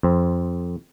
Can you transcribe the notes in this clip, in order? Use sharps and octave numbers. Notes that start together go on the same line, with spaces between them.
F2 C4